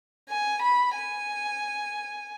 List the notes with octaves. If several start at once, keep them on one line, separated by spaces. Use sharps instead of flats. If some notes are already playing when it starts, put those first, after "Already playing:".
G#5
B5
G#5